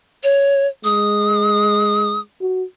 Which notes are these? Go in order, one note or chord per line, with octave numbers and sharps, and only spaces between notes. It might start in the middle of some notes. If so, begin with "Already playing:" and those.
C#5
G#3 D#6
F#4